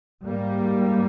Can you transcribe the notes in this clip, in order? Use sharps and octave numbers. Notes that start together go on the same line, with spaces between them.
G#2 G3 A#3